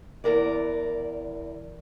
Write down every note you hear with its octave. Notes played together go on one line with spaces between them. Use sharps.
E2 B2 A#4 D5